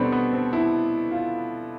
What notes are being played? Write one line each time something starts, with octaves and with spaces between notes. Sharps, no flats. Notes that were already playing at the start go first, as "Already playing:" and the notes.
Already playing: B2 G3 B3 C4 D4 A4
B3
C4
E4
F4